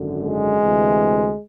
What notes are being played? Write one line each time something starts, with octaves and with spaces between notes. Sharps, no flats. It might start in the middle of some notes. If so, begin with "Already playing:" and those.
Already playing: G#1 F#2 D3
G#3
D2 C3 E3